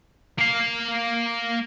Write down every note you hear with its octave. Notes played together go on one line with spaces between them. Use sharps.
A#3 F5